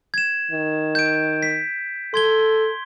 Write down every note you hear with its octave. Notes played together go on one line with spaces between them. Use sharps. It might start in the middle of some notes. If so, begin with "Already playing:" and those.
G#6 E7
D#3
G6 D7
B6
A4 C6 G#6 G7